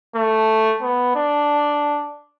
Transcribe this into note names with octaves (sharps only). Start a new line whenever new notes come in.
A3
B3
D4